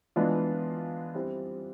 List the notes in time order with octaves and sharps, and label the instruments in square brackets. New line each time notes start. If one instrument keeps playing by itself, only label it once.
[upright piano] E3 G#3 B3 D4 F4
G3 C4 E4